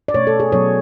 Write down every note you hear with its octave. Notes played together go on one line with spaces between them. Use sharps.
D5
B2 A3 C#5
A4
G#4
B2 F#3 B3 C#5